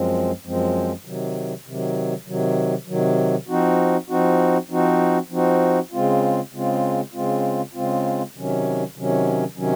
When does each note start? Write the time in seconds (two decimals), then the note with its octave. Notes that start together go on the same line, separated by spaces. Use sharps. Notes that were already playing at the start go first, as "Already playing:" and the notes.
Already playing: F#2 F3 G#3 C4
0.44 F#2 F3 G#3 C4
1.05 C3 D#3 F#3
1.65 C3 D#3 F#3
2.27 C3 D#3 F#3
2.87 C3 D#3 F#3
3.48 F3 C4 D#4 F#4
4.09 F3 C4 D#4 F#4
4.70 F3 C4 D#4 F#4
5.30 F3 C4 D#4 F#4
5.92 C#3 G#3 C4 F4
6.53 C#3 G#3 C4 F4
7.13 C#3 G#3 C4 F4
7.74 C#3 G#3 C4 F4
8.34 C3 D#3 F#3 C#4
8.96 C3 D#3 F#3 C#4
9.56 C3 D#3 F#3 C#4